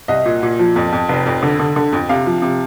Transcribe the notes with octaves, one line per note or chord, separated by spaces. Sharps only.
C2 D#5
A#2
A#2
F3
F2
F2
F1
F2
D3
D3
D3
F2
C3 F5
F3
C3